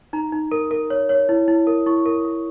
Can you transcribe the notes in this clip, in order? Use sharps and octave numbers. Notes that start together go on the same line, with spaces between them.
D#4 A#5
D#4
A#4
A#4
C#5
C#5
E4
E4
A#4
E4 C#6
A#4
A#4